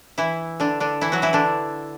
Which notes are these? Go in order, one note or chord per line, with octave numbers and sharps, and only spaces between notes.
E3 E4
D3 D4
D3 D4
E3 E4
F#3 F#4
E3 E4
D3 D4